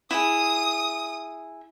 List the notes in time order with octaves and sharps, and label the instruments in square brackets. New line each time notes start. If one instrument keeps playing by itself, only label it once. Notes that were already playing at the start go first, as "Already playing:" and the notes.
[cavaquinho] E4 G#4 [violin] D#6